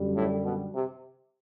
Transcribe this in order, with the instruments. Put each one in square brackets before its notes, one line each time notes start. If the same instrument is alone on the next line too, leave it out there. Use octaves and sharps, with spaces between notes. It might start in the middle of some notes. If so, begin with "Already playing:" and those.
Already playing: [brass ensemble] F#2 D3 G3
[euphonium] A2
B2
C3